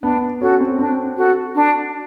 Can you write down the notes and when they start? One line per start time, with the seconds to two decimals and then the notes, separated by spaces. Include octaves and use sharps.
0.02 B3 D4
0.41 C#4 F#4 A4
0.60 C4
0.79 C4 D4
1.17 F#4 A4
1.56 D4